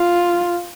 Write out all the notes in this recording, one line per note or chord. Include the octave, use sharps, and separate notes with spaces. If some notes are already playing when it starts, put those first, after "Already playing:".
Already playing: F4